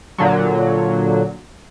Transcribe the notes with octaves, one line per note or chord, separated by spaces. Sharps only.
A#2 D3 F#3